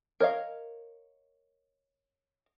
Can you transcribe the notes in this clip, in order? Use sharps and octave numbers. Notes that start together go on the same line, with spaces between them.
A#4 C#5 D#5 F5